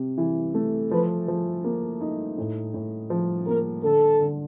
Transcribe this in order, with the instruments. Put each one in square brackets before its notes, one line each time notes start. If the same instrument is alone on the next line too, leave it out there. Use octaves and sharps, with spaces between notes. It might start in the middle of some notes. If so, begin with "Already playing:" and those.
Already playing: [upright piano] C3
E3
A3
[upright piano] F3 [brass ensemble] B4
[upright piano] F3
A#3
D#4
A2
A2
F3
[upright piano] A#3 [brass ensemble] A#4
[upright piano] D3 [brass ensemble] A4
[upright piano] D3